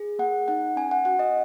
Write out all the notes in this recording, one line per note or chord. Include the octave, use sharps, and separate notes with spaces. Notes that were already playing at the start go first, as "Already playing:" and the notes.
Already playing: G#4
A#3 F#5
D#4 F#5
C#4 G#5
F#5
F#4 F#5
D#5